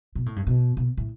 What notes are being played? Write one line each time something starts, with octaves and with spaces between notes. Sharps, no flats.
B2
A2
G2
B2
B2
A2